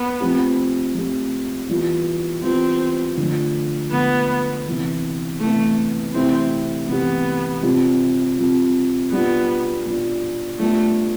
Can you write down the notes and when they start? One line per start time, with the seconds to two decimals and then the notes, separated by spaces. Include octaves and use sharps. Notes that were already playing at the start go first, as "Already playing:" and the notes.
Already playing: B3
0.20 F3 A3 C4 G4
0.94 F3 A3 C4 G4
1.69 E3 G3 B3 F4
2.43 E3 G3 B3 C4 F4
3.17 D3 F3 A3
3.91 D3 F3 A3 B3
4.66 C3 E3 B3
5.40 C3 E3 A3 B3
6.14 C3 E3 A3 C4 E4 G4
6.88 C3 E3 A3 B3 E4 G4
7.63 C3 G3 C4 F4
8.38 C3 G3 C4 F4
9.11 B2 G3 B3 D4 F4
9.85 B2 G3 D4 F4
10.59 G3 A3 B3 D4 F4